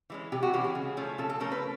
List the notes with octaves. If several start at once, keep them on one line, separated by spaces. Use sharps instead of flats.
E3 G#3 C#4
C3 G4
F#4
E3 G#3 C#4 G4
G#4
C#3
F3 A3 C#4
C#3 A4
A4
F3 A3 C#4 A#4
B4